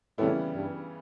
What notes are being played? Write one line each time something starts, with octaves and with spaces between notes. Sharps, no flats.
A2 C#3 E3 G3 B3 E4
G2